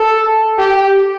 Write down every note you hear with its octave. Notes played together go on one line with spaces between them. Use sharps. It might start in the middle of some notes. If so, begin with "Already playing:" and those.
Already playing: A4
G4